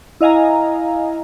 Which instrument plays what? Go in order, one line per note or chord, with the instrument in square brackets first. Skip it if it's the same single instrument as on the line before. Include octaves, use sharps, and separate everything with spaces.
[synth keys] E4 D#5 F5 G#5 A#5